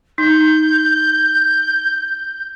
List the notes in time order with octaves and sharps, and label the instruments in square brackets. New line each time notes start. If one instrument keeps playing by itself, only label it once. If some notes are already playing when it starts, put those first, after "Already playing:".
[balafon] D#4 [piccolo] G6